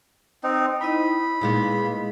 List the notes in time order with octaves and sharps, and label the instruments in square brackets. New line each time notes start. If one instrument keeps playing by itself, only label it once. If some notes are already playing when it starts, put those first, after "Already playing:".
[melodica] C4 D#4
[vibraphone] D#4 E4 D#5 [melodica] B5
[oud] A#2 G#3 B3